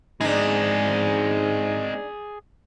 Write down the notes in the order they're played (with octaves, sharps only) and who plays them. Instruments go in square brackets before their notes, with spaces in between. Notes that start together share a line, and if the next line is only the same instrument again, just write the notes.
[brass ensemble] G#2 [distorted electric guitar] G#3 C4 [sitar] D4 D#4 [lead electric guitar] G#4 D5